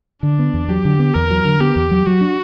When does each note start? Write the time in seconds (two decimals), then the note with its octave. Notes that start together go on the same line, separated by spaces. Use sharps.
0.23 D3 D4
0.39 B3
0.54 E2
0.69 F#3 G4
0.85 D3
0.99 B3
1.14 E2 A#4
1.30 F#3
1.45 D3
1.60 B3 G4
1.76 E2
1.91 F#3
2.07 F#3 F#4
2.21 D4